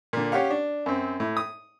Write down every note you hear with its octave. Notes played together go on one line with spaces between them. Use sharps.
A#2 D3
C#4 G4 F5 F#5
D4
F#2 C4
A2
D#6